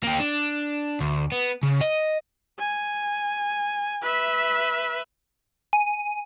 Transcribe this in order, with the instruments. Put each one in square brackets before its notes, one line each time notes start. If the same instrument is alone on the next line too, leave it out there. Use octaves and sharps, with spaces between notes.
[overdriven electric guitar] A#3 G4
D4
D2
B3
C#3
D#5
[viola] G#5
B4 E5
[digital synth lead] G#5